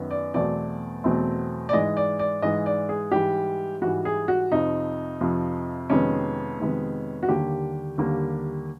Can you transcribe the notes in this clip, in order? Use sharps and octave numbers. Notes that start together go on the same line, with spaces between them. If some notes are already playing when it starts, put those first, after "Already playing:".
Already playing: F#2 D#3 F#3 B3
D5
E2 B2 F#3 A3 C4 D5
E2 B2 F#3 A3 C4
D5
G#2 E3 G#3 D#5
D5
D5
G#2 E3 G#3 D#5
D5
G#4
G#2 E3 G3 G4
G#2 E3 G3 F#4
G#4
F#4
F2 C3 F3 D#4
F2 C3 F3
F2 C3 D#3 G#3 B3 C#4
F2 C3 D#3 G#3 B3
F#4
D#2 D3 G3 A#3 G4
D#2 D3 G3 A#3